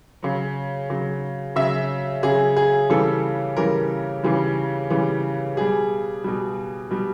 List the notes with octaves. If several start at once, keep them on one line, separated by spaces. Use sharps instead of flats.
C#3 F#3
C#3 F#3
C#3 F#3 E5
C#3 F#3 G#4
G#4
C#3 E3 G3 A4
C#3 E3 G3 A#4
C#3 E3 G3
C#3 E3 G3
B2 G3 G#4
B2 G3
B2 G3